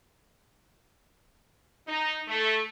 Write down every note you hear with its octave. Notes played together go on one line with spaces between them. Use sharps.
D#4
A3